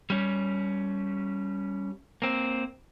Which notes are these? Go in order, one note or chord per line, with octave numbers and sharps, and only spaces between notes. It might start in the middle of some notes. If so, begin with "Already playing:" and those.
G3 C#4
A#3 C4